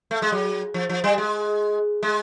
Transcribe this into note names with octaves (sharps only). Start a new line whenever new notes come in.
A3
G#3
F#3
F3
F3
G3
G#3
G#3